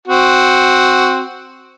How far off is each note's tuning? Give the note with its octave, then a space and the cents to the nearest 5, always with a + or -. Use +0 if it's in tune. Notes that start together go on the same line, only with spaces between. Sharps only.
C4 +0 F#4 +0